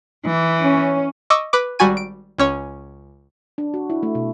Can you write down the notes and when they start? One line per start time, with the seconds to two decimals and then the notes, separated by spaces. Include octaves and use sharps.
0.23 E3
0.61 C#4
1.30 D#5 C#6 D6 E6
1.53 B4 D6
1.79 G#1 G3 F#4 G#5 D#7
1.97 D7
2.38 C#2 C#4 C#5
3.58 D4
3.74 F#4
3.90 E4
4.03 A3
4.15 B2